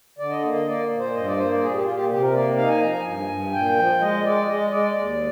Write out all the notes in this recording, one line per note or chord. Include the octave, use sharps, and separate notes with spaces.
D3 D5
D#5
A#3
D#5
A#3 D5
A#2
C5
G2 D#5
D5
A#3 C5
D5
A#2 G#4
G4
A#2 F4
G4
C3 G4
A#4
A#3 D5
D#4 F5
G#5
F3 A#5
G#5
G2
G2
A#2 G5
F3
G#3 D#5
G#3 D5
G#3 D#5
G#3 D5
D#2